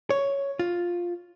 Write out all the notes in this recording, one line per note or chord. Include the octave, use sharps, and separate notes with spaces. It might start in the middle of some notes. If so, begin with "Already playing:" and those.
C#5
F4